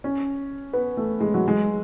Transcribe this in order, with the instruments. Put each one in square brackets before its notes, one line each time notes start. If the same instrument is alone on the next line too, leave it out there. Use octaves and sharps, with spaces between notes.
[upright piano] C#4
B3
A3
G#3
F#3
G#3